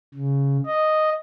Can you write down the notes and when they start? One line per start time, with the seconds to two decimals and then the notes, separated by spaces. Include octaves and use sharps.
0.14 C#3
0.66 D#5